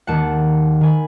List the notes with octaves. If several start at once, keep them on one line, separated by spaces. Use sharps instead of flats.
D#2 D#3 F#5 A5
D#3 G#5 B5